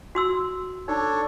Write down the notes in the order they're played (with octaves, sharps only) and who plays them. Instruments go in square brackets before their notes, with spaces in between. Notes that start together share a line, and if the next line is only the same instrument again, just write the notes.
[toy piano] F#4 C6 E6
[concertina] D4 A4 C#5 [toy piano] D#4